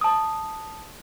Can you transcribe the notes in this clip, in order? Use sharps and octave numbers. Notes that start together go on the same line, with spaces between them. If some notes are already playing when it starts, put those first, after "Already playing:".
A5 D#6